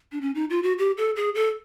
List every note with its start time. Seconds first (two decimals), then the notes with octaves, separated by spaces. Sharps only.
0.12 D4
0.21 C#4
0.35 D#4
0.50 F4
0.63 F#4
0.78 G4
0.97 A4
1.16 G#4
1.35 A4